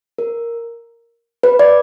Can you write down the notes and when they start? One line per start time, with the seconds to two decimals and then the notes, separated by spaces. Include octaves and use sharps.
0.18 A#4
1.43 B4
1.59 D5